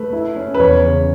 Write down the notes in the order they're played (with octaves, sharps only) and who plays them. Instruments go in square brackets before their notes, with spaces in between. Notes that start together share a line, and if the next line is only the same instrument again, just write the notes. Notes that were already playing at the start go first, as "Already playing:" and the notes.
Already playing: [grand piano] A3 B4
E4
C#4
B4
E2 C#5
C#3